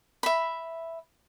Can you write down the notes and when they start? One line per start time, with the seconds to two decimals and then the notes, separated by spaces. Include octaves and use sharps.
0.23 E5 B5